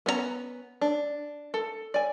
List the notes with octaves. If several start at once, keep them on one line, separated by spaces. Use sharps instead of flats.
B3 C#4 C5 A#5
D4
A4
D5 G#5